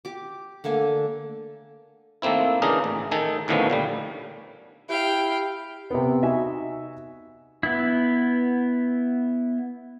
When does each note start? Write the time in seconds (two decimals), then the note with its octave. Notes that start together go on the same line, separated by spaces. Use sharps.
0.05 G4 D6
0.64 D3 A3 A#3 G#5
2.22 D#3 A3 A#3 C4 E4
2.62 C#3 E3 D4 D#4 G#4 A#4
2.84 A1
3.11 D#3 D#4 G#4 A4
3.48 D2 A2 D#3 F3 B3 C#4
3.70 A#2 D3 G3
4.89 E4 G4 F5 G5
5.91 C3 B3
6.23 D#4 F#4 E5 G#5
7.63 B3 E4